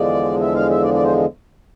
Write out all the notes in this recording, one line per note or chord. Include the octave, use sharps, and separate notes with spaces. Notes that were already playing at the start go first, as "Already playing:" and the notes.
Already playing: E2 D3 F3 G#3 D5
E5
F5
E5
D5
D5
C5